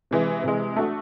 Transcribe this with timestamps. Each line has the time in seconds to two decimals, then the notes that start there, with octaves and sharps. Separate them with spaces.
0.11 C3 E3 G#3
0.43 C3 E3 G#3
0.76 A3 D4 F#4 A4